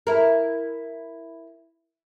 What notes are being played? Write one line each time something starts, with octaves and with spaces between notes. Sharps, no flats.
E4 A#4